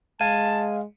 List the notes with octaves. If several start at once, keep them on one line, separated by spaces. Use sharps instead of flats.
G#3 F5 G#5 A5